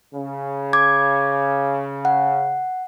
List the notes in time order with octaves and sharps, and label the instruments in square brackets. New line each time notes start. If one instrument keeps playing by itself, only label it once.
[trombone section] C#3
[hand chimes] D6 G#6
F#5